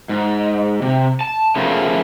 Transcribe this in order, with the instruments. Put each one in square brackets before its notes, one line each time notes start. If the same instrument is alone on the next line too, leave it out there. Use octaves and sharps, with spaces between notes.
[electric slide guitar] G#2
C3
A5
C#3 F3 A3 A#3 C#4 F4